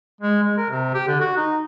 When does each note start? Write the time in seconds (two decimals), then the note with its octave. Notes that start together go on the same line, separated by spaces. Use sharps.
0.21 G#3
0.43 G#3
0.57 A#4
0.70 C3
0.94 G4
1.08 D3
1.20 F#4
1.37 D#4